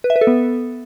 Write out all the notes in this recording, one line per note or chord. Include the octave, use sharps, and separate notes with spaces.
B4
E5
B4
A4
B3